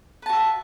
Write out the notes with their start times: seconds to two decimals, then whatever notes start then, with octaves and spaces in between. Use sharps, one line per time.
0.22 B4
0.26 A5
0.29 F#4
0.33 E5